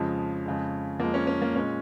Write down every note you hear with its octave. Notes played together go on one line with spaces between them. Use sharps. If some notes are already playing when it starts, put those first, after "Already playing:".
Already playing: F2 C#3 F3 G#3 C#4
F2 C#3 G#3
F2 F3 G#3 A#3
C#4
C#4
A#3
A#2 G#3 C#4